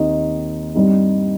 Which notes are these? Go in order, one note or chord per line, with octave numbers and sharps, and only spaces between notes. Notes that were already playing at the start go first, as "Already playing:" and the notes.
Already playing: D#2 D#3 C4 D#4
G2 G3 C4 D#4